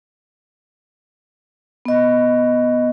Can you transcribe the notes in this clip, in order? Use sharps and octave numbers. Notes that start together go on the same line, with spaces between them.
B3 D#5